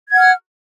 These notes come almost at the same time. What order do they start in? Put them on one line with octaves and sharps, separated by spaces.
G#6 F#5 F6